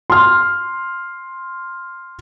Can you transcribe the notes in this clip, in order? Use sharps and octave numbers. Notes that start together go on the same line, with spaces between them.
C6 F6